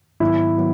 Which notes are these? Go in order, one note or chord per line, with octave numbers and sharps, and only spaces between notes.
G#2 D#3 F#3 B3 E4
D#3 F#3 B3